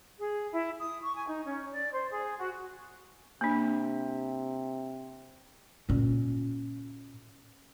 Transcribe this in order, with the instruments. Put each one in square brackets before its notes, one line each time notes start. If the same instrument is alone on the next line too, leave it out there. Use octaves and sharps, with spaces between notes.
[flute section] G#4
E4
D#6
C#6
G#5
D#4
C#4
D5
C5
G#4
F#4
[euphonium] C3 [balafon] A#3 D4
[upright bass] A#2 C#4